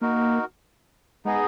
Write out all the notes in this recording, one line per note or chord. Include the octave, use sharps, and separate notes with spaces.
A#3 D#4 F#4 A#4
G#3 B3 D#4 G#4 D#5